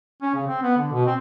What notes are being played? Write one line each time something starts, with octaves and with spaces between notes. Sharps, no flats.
C#4
C#3
C4
B3
D3
B2
C4